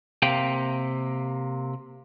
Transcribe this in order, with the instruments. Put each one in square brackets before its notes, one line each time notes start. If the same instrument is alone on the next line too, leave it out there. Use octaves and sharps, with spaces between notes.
[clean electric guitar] C3 A#3 G5